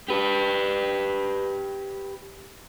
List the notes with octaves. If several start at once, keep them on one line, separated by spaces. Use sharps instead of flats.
G4 B4